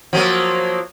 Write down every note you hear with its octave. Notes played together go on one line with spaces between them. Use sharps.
F3 F#3 A#3